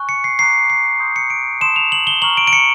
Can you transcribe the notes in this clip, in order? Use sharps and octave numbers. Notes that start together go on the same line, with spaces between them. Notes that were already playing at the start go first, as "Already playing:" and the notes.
Already playing: G#5 C#6 F#6
C#7
C7
A#5 D6 F#6 C7
C7
C6 D#6 G6
C#7
D7
A5 C6 D#6 E7
F7
F#7
G7
A#5 C#6 F6 F#7
D7
D7
C#7